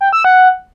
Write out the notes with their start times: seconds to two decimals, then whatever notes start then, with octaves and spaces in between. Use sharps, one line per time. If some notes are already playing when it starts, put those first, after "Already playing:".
0.01 G5
0.13 E6
0.24 F#5